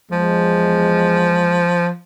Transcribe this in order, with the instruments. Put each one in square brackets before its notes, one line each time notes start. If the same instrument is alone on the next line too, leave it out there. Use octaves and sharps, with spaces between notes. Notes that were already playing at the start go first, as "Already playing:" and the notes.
[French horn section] E2 G#3 [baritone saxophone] F3